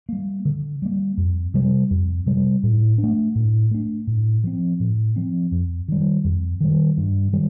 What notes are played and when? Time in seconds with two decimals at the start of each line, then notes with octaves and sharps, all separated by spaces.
0.09 G3 A#3
0.45 D3
0.82 G3 A#3
1.17 F2
1.54 C3 G3
1.91 F2
2.26 C3 G3
2.63 A2
2.98 D4
3.03 A3
3.35 A2
3.71 A3 D4
4.07 A2
4.44 F3 C4
4.80 A2
5.16 F3 C4
5.52 F2
5.88 D#3 G3
6.24 F2
6.61 D#3 G3
6.97 G2
7.33 D#3 G3